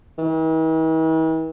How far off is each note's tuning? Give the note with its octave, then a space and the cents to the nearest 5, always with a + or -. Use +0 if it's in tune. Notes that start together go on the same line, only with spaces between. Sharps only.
E3 -45